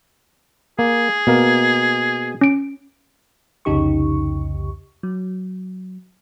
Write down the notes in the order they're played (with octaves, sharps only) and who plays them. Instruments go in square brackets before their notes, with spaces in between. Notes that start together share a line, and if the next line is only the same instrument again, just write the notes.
[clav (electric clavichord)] A#3 [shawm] G#4
[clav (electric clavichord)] B2 A#3 A#4
[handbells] C#4 D7
[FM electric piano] C2 F2 C#3 D#4 G4 C#6
F#3